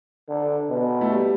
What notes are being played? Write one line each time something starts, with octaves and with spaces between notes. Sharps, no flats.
D3
B2
A3
G3